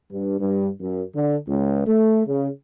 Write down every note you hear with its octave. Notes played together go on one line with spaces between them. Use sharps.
G2
G2
F#2
D3
C#2
A3
C#3